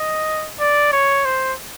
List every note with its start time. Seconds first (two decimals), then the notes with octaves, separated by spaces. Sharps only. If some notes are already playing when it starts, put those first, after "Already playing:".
Already playing: D#5
0.60 D5
0.93 C#5
1.25 C5